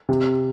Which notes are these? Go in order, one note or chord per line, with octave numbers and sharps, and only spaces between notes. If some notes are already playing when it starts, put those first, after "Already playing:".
C3